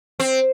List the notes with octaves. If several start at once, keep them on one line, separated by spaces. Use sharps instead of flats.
C4